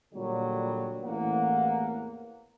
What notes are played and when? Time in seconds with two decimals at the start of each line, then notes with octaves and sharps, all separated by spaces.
0.13 A#2 D3 F#3 G3
1.03 A1 E2 A#3 F#5